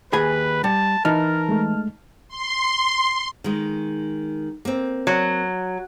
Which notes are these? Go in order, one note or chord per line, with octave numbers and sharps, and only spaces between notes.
D#2 G#4 B4 G#5 B5
G3 A5
E3 D#4 A#4 A5 F6
G#3 A3
C6
D#3 G#3
A#3 C4
F#3